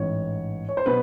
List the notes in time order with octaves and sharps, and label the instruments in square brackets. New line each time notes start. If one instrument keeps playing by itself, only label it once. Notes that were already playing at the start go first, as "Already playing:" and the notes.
Already playing: [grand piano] A1 G#2 E3 C#5
C#5
C5
B2 F#3 B4